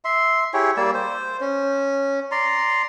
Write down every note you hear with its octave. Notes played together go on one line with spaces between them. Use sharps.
E5 C6
E4 G4 G#4 C#5
G3 A#3 D5 E6
C5
C#4
D5 A#5 C6